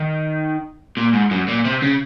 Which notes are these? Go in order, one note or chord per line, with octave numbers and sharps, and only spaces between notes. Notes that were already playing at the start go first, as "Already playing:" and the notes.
Already playing: D#3
A#2
G#2
F#2
A#2
C3
C#3